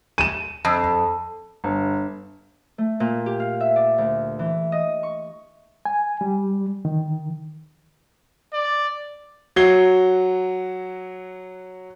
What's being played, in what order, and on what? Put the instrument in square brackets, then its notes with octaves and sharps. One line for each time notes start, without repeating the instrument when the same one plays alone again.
[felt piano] D#7 E7
[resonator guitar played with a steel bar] F2
[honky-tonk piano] G1
[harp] A3
A#2
G4
F5
E5
D5
D2
E3
D#5
C#6
[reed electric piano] G#5
G3
D#3
[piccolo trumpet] D5
[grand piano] F#3 F#4 G#6 C7 G7